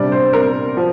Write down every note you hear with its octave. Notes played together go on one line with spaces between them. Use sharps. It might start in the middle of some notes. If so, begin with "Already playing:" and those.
Already playing: C3 G3 D4 D5
C5
A#4
F3